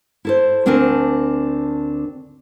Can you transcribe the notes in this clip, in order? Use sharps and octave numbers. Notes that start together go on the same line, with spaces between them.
E4 A4 C5
D2 C4 D4 A#4 G#5